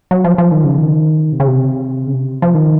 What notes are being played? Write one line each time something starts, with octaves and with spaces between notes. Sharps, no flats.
F#3
F3
F3
D#3
C#3
D#3
C3
C#3
C3
C#3
C3
F3
D#3